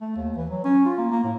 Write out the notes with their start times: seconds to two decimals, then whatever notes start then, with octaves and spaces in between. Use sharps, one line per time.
0.01 A3
0.16 D#2
0.36 E3
0.50 F#3
0.64 C#4
0.85 F4
0.98 A#3
1.12 A#3
1.24 A2